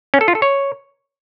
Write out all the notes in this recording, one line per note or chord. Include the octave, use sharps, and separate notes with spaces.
C#4
A4
F4
A4
C#5